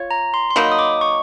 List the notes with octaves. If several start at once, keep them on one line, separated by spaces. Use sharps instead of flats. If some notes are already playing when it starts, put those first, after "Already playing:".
Already playing: F4 C#5
A#5
C6
C6
F#3 A#3 D#4 B5
D#6
D6
C#6